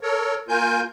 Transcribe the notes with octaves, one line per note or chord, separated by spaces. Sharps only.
A4 A#4 C#5
A#3 F4 A#4 G#5 G6